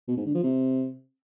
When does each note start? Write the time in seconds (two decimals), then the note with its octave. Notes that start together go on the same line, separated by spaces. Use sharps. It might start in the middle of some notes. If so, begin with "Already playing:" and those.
0.08 B2
0.17 G#2
0.26 D3
0.34 F3
0.43 C3